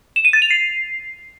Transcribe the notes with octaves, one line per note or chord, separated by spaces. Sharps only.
E7
D#7
A6
F7
C7